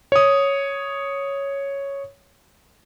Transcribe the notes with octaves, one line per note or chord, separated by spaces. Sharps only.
C#5 D#6